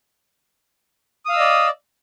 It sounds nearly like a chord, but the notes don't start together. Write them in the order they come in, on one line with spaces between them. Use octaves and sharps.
D#6 F5 E6 D#5 D5